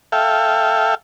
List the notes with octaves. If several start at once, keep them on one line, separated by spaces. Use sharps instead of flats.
A4 E5 F5 G5